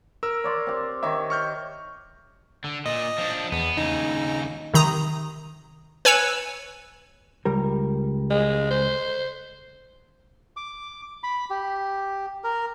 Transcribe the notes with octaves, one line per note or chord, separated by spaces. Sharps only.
A#4 E6
C#5 D5 C6
C4 G4
D#3 C#5 E5 D6
C#6 F6 G6
D3
A#2 D#5
F3 D4
E2 B3
D#2 C#3 D#4
C3 D#3 A#5 D#6
B4 C#5 G#5 E6 C#7 E7
C#2 G3 A#4
G#3
C5
D6
B5
G4
A#4